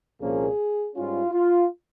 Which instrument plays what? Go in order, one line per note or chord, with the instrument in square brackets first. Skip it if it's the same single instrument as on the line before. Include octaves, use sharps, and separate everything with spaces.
[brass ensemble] C2 A#2 F3 A#3 C#4 G#4
G#2 G3 C#4 F4
F4